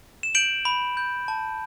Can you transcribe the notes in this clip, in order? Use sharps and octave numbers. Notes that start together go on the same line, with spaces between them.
E7
G6 D7 F#7
B5
G6
A5